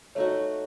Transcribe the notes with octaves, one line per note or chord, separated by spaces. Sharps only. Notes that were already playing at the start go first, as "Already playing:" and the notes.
A3 D#4 F#4 C#5